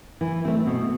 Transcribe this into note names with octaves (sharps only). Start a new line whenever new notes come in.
E3
A3 C4
B2